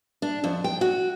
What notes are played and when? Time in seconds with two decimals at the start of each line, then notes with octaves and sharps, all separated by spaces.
0.22 D4
0.44 F2
0.64 G5
0.81 F#4